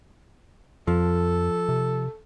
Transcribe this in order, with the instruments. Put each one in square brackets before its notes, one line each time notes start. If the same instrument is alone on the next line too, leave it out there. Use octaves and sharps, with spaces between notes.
[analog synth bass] F2 [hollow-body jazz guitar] F3 [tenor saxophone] A4
[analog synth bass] C3